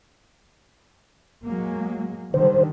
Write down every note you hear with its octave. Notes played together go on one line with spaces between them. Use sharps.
F#3 G#3 A#3
D3 D#3 G3 C5